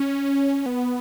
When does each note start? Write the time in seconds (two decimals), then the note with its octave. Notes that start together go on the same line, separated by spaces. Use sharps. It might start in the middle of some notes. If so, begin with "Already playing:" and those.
Already playing: C#4
0.66 B3